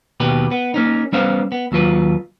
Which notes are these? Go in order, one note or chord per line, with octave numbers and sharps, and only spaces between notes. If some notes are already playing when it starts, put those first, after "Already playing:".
D#2 B2 G4 B4
B3
A#3 C#4 D#4
G3 B3 C#4 B4 C5 F5
B3
D#2 F#3 F4 B4